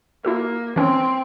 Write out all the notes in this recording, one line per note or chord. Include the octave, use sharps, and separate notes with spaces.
A#3 E4 F#4 A4
E3 C4 C#4